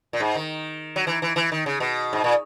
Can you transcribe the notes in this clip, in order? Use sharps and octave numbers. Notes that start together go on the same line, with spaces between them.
A#2
G#2
D#3
F#3
E3
E3
E3
D#3
C#3
B2
G#2
A#2